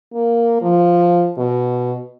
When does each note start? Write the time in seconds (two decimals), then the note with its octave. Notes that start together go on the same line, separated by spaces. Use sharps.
0.14 A#3
0.62 F3
1.37 B2